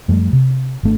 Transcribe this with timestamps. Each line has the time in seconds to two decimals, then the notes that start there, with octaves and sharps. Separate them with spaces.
0.08 F#2 F3 G3 A3
0.33 C3
0.83 G#1 A3 D4